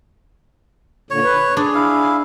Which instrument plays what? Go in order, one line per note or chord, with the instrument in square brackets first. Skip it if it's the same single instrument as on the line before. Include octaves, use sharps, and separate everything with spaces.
[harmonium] A#2 D3 [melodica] C#5
[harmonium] B4
[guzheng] D4 [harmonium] G#4
[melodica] E4 F5